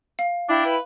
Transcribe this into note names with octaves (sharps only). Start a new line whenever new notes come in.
F5
D4 E4 G5
B4